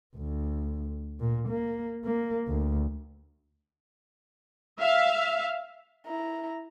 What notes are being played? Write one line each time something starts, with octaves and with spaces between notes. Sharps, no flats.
D2
A#2
A#3
A#3
D2
E5 F5
E4 A#5